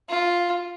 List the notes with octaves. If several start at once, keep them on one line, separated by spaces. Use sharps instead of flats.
F4